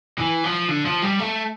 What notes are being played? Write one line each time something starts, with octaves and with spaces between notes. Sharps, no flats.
E3
F3
D3
F3
G3
A3